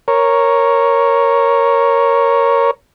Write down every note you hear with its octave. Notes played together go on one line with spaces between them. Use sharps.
A#4 C#5